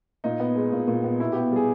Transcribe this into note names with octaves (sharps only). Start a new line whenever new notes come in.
A#2 D#4
B3
G#3
A#2
A#2
B3
B2 E4
B3 G4
G3 G#4